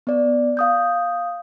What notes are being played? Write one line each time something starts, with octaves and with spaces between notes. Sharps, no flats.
B3 D5
F5 D#6 G6